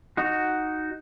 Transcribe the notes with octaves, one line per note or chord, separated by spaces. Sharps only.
D#4 F#4